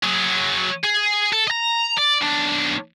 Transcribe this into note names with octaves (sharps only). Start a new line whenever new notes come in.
F#3 G#4
G#4
A4
D#5 A#5
D5
B1 D4